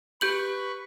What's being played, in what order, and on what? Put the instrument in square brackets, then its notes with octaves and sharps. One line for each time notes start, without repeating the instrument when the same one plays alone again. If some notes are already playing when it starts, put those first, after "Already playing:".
[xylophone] G4 G6 F#7 [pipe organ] B4 C#6